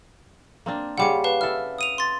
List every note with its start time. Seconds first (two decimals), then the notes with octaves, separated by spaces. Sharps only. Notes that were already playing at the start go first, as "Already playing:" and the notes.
0.66 A#3 C4 D4
0.98 C#3 G3 C4 F#5 D6 C#7
1.24 B4 F5 A5
1.41 E4 A4 F6
1.78 D#6 D#7 F7
1.98 C6 A6